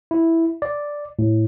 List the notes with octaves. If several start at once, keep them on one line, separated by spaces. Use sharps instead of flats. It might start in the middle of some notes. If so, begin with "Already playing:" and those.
E4
D5
A2